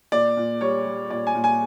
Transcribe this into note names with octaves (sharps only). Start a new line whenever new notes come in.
A#2 D5
A#2
G3 C#5
G3
A#2 D5
G#5
A#2
G#5